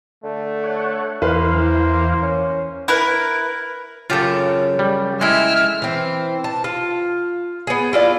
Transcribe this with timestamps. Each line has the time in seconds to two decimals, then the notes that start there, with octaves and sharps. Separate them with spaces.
0.24 D3 A3
0.64 C#5 F#5
1.22 E2 A#3 E4 B4 C5 F5
1.54 E3
2.22 C#4
2.88 E4 A#4 B4
4.10 F#2 C#3 F4 G4 A4
4.79 G3
5.21 G#3 E4 A4 E5 G5 F6
5.82 E3 C4
6.44 A5
6.64 F4
7.67 B3 G#4
7.93 E4 F4 D5